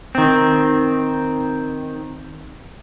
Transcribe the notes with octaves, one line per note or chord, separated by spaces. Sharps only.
D#3 C4